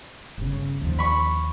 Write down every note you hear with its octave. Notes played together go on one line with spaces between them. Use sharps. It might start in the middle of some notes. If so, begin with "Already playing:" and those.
G1 C#3
D#2 F3
B5 C#6